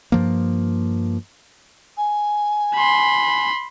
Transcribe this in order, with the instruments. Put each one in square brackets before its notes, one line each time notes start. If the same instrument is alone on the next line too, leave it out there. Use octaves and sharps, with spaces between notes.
[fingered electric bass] G2 F3 A#3
[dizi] G#5
[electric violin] B5 C6